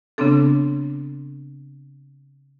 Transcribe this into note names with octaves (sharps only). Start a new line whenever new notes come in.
C#3 B3 C4 D4 A4